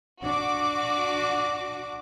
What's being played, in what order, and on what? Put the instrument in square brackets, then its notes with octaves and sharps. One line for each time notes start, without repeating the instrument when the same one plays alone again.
[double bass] D4 [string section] F#4 D6